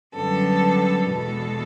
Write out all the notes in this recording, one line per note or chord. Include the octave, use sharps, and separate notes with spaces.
F#2 D3 G3 B3 A4
E2 B2 G#3 A4